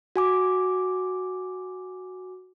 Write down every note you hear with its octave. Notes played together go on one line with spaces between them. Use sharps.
F#4 G#5 D6